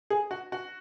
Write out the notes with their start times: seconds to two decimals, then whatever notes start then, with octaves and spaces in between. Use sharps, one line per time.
0.10 G#4
0.31 F#4
0.52 F#4